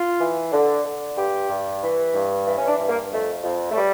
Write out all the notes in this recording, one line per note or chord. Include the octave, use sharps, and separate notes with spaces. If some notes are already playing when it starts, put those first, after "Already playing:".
Already playing: F4
E3
D3
D3
G2 G4
G2
E3
G2
E3
C#4
D4
G2
A#3
F2 A3
F2
A3
G3